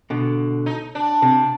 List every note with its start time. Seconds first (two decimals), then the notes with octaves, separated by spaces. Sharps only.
0.10 B2 D3
0.66 D#4
0.95 D4
1.22 C3